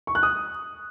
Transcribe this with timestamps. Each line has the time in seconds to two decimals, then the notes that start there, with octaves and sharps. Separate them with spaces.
0.07 C#6
0.15 F#6
0.23 D#6